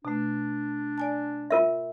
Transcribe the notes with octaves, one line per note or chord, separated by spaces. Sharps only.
B2 A3 D4
D5 G#5 A5
F4 A#4 E5